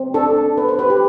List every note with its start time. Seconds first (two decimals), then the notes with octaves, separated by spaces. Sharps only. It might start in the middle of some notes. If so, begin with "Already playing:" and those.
Already playing: C4
0.14 D4 A4
0.37 D4
0.57 B3 B4
0.69 C5
0.79 G4 B4
0.90 G4